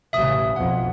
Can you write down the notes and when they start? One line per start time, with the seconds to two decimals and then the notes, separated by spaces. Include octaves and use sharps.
0.13 A1 C#3 E5 D#6
0.56 B1 F2 F#5